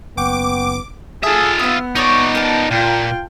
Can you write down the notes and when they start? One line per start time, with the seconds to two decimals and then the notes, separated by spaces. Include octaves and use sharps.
0.17 F#1 B3 F#5 G5 C#6 D6
1.23 F4 G#4 A4 E5 D#6
1.59 B3 D#6 E6
1.95 D#4 C#5 D5 C#6 D#6
2.35 A#4 A5
2.71 A#2 F4 G5